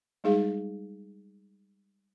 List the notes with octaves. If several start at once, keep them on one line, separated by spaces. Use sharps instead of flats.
G3 G#3 D#4 G#4 F5